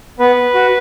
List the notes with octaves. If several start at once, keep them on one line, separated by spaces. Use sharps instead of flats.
B3 B4
F#4